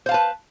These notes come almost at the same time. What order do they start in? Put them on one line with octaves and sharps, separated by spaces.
C5 F5 A5 B4